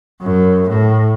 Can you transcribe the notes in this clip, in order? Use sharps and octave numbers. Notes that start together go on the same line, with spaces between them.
F#2
A2